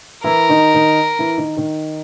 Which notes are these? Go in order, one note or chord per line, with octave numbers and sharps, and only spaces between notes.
E3 E4 A#4
D#3 D#4
D#3 D#4
E3 E4
D#3 D#4
D#3 D#4